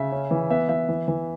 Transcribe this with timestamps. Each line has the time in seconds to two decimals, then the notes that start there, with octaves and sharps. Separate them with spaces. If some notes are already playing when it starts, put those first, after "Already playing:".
Already playing: C#3 E5
0.12 C#4
0.31 E3
0.50 B3 E5
0.69 E3 E5
0.89 E3
1.08 E3